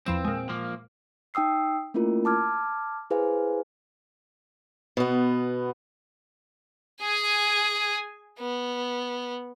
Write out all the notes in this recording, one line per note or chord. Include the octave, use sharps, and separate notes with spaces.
E2 F3 C4 E7
A#2 G#3
F3 A#3
D#4 G5 D#6 E6 C7
A3 A#3 C#4 E4 F4 A#4
A5 D6 F6 G#6
E4 G#4 B4 C5 F5 G#5
B2 B3
G#4 G#5
B3